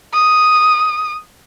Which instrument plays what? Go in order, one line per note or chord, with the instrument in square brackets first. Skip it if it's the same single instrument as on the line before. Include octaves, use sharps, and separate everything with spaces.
[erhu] D#6